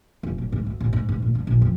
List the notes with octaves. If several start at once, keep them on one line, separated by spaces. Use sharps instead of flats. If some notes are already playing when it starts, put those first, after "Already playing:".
F1
D1
G#2
D2
A1
G#2
G#2
A#2
G2
A#1
F2